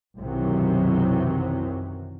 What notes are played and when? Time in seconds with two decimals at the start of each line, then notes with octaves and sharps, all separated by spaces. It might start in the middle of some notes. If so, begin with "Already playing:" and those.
0.17 B1 F#2 C3 D#3 E3 F#3